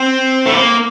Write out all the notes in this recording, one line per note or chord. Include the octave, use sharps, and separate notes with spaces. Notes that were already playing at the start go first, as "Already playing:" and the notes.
Already playing: C4
A3
A#3